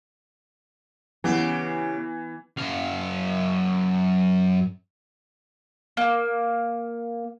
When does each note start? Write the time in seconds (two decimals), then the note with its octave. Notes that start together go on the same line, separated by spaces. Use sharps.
1.24 C#3 E3 B3 G4
2.58 F#2 F5
5.97 A#3